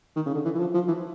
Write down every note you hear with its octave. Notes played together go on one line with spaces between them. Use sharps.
D#3
C#3
D3
E3
E3
F3
F3
E3